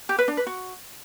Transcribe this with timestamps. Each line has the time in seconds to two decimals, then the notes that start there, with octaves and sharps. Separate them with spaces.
0.09 G4
0.18 B4
0.28 D4
0.37 B4
0.47 F#4